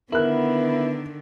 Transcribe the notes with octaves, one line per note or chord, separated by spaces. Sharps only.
D3 D#3 B3 E4 A#4 F#6